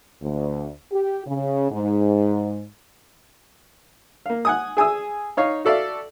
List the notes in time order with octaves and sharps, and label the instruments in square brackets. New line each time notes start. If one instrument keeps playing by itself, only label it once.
[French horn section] D2
G4
C#3
G#2
[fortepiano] A#3 F5
F#5 G#5 D#6
G#4 G#5 D#6 E6
D#4 C#5 F5
F#4 A4 D5 E5 F5